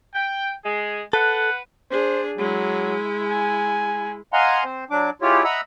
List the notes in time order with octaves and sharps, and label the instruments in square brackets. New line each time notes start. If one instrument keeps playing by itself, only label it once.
[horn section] G5
G#3 G#4
[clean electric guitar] A4 [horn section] B4 F#5
[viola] D4 G#4 [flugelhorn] C5
[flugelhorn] F#3 [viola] G#3 E4
[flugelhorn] G#5
[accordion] D#5 F5 F#5 G#5 A#5 C6
C4 C5
F#3 D4 D6
G#3 E4 F4 G4 C#5
D#5 E5 F#5 A#5 B5 E6